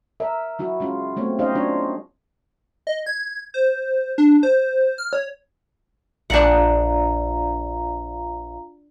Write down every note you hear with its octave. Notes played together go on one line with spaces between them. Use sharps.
A#4 E5
F#3 E4 F#4
G#3 C#4 F4
F#3 G#3 A3 B3 C4 C#5
C#4 D#4 G4 C5 D#5 F5
F#3 C#4 D4 F4 C#5
D#5
G#6
C5
D4
C5
F6
C#5
A#1 D4 F4 F5 F#5 A#5